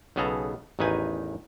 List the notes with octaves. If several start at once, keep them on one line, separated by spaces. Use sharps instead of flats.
B1 C#3 B3 G#4 A4 A#5
A1 E2 D#3 D#4 B4 G#5